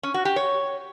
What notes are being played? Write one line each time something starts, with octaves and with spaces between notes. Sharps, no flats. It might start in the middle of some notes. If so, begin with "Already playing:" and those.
C#4
F#4
G4
C#5